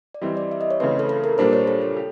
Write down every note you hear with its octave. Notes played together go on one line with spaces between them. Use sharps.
D5
E3 G3 C4 D#5
D5
E5
D#5
C#5
C#3 E3 A3 C4 B4
A4
A4
A#4
A#2 G3 A#3 D4 C5
C#5
A4
A4
G4